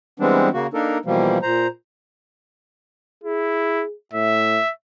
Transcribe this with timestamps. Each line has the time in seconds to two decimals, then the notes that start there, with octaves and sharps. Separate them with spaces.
0.20 E3 G3 G#3 B3 C4 D4
0.54 C#3 A#3 F#4
0.74 A#3 D4 D#4 A4 A#4
1.05 B2 E3 F3 G3 A#3
1.42 A#2 C5 A#5
3.24 E4 G#4
4.13 A2 E5